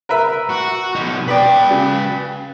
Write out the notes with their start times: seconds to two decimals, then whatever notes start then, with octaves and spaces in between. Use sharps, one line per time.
0.09 A#4 B4 E5
0.49 F#4
0.95 B2 D#4
1.28 B3 B4 D5 G5
1.71 C#3